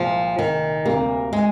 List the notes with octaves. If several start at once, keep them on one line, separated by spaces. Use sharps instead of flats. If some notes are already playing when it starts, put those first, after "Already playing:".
Already playing: C2 A#2 F3 G#3
D#3
D2 C3 G3 A#3
G#3